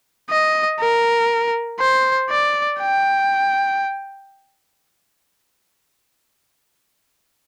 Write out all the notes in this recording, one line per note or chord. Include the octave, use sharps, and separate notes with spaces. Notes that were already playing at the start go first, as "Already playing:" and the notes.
D#5
A#4
C5
D5
G5